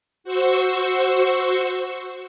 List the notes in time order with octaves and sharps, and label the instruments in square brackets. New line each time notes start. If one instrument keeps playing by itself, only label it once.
[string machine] F#4 C5 C#6 E6